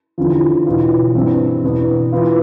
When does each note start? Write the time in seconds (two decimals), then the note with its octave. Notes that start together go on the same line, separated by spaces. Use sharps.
0.18 E2 D3 F3
0.67 E2 B2 B3 F4
1.15 G2 E3 G3 C4
1.64 E2 B2 B3 D4
2.12 E3 B3 F4